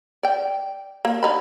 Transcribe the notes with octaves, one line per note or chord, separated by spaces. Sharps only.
D5 G5
A#3
D3 D#4 B5